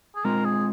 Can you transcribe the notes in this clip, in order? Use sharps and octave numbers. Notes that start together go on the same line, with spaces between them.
G#4
G#3 C4 F4 A#4
G#4